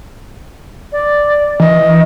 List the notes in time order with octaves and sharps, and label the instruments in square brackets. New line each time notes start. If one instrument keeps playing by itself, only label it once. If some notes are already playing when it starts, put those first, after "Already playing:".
[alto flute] D5
[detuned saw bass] E3 [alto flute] D#5